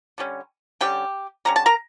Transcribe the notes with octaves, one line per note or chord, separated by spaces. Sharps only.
D3 G3 C#4
D3 G3 C#4 G4 G5
D3 G3 C#4 A#5
A5
A#4 A#5